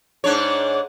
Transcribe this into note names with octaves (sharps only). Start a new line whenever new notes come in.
G#2 D4 C#5